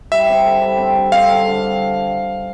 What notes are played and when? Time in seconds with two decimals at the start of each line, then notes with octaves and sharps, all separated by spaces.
0.12 G3 E5
0.29 C4
0.45 D3
0.62 G3
0.79 C4
0.96 D3
1.12 C4 F5
1.29 D3
1.45 D3